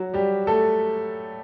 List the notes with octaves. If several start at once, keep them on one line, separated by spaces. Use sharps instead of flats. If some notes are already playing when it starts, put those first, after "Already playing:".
Already playing: F#3 F#4
G3 G4
A3 A4